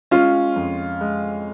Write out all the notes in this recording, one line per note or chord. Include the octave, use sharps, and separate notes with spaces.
G#3 C#4 F4
F2
G#3